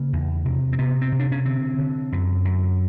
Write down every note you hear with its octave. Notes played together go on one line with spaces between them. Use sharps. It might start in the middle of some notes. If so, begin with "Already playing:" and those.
Already playing: C#3 A#3
E2
C3
C4
C3 B3
C4
C3
D4
C#4
D3 C4
D3
F#2
F#2